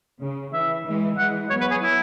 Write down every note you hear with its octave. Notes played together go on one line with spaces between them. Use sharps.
C#3
E3 E5
E3 G#3
E3 G#3 F#5
F#3 B3 C#5
B4
G#4
E4